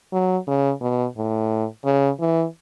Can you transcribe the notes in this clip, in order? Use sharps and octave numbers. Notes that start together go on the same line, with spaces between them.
F#3
C#3
B2
A2
C#3
E3